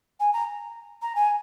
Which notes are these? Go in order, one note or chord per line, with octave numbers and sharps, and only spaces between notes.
G#5
A#5
A#5
G#5